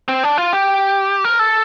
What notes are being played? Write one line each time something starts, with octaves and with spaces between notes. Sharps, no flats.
C4
D4
F4
G4
A#4
A4